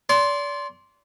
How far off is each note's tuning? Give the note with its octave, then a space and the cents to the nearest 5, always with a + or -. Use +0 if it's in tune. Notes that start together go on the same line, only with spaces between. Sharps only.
D5 -35 C6 +0